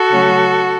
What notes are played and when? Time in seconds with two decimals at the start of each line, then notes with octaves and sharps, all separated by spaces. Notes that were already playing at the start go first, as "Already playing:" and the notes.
Already playing: F#4 A4
0.10 C#3 F#3 A3 C#4